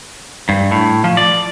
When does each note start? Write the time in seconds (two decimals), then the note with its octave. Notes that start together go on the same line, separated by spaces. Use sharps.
0.49 G2
0.71 A2
1.04 F3
1.17 D5